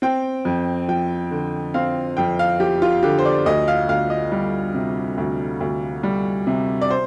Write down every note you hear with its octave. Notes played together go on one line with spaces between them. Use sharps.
C4 G5
F2
F3 G5
D3
C4 F5
F2 G5
F5
F3 G4
F4
D3 G4
C5
D5
D2 D#5
F5
D2 F5
D#5
G3
C3
D2
D2
G3
C3
D5
C5